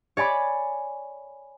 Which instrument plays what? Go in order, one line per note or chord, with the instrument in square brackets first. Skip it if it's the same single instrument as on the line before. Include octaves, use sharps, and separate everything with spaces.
[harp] C#5 D5 G#5 B5 D6